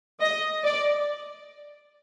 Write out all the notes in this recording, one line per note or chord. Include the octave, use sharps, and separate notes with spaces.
D#5
D5